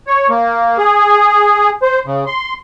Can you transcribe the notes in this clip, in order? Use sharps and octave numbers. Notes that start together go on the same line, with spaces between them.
C#5
A#3
G#4
C5
C#3
C6